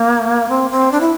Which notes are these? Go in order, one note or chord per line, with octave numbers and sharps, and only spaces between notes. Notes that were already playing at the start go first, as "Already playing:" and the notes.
Already playing: A#3
C4
C4
D4
E4